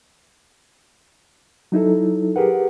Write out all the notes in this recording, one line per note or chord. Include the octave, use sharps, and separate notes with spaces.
F#3 D#4 E4 A4
G4 G#4 A#4 B4 F#5